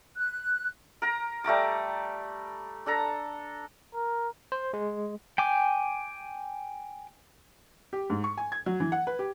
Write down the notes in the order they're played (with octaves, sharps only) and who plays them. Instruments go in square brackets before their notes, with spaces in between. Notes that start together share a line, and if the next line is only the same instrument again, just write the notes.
[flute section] F#6
[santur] A#4 A#5
G3 A3 A#5 D6
D4 A4 A#5
[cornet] A#4
[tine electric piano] C5
G#3
[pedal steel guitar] G5 G#5 D6
[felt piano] G4
G#2
C#6
G#5
G#6
F#3
E3
F#5
B4
G4